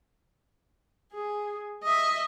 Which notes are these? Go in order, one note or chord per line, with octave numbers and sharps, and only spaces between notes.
G#4
D#5 E5